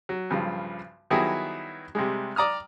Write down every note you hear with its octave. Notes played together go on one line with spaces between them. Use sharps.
F#3
B1 G2 C#3 F3
D#3 F#3 G3 B3 E4 G#4
C3 G3 G#3
D5 A#5 D#6 F6